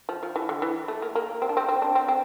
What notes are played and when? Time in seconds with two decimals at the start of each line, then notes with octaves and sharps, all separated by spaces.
0.09 F3
0.23 F3
0.36 E3
0.49 D3
0.62 E3
0.88 A3
1.02 A#3
1.15 A#3
1.42 C4
1.49 D4
1.57 C4
1.68 C4
1.82 D4
1.95 C4
2.08 C4